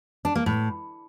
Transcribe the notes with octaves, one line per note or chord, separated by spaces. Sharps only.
D4
A#3
A2